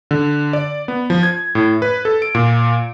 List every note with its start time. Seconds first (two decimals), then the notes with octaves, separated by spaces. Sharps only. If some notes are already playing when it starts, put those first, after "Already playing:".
0.11 D3
0.53 D5
0.88 B3
1.10 F3
1.23 G#6
1.55 A2
1.82 B4
2.05 A4
2.22 D7
2.35 A#2